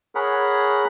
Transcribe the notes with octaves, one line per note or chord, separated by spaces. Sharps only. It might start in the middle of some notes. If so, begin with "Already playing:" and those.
G#4 A#4 C#5 F#5 B5